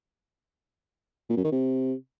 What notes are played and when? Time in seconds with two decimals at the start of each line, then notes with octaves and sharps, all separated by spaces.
1.30 A#2
1.37 F#2
1.44 D#3
1.52 C3